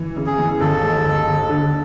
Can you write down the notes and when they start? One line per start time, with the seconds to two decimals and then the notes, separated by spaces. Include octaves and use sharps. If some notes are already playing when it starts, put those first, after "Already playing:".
Already playing: E3
0.16 C#3
0.26 G#4
0.38 E3
0.60 D#2 A4
0.82 G#3
1.04 D#2
1.27 D#2
1.49 D3